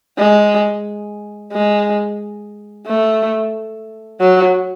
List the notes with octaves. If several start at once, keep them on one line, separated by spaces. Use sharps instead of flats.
G#3
G#3
A3
F#3